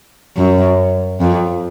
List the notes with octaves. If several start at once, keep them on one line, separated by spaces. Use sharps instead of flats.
F#2
F2